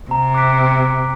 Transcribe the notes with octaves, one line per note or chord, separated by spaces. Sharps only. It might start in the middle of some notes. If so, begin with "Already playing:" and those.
C3 A#5
D6 F#6 B6 D7